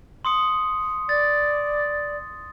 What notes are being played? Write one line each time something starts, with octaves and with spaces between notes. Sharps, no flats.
C6 D#6 C#7
D5 A6